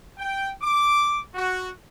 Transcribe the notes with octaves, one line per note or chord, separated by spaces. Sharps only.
G5
D6
F#4